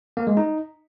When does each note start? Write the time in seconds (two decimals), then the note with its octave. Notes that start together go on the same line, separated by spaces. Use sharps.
0.17 A#3
0.27 G#3
0.37 D#4